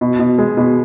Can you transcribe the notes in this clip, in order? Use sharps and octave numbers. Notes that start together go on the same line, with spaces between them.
B2
B2
G#3
B2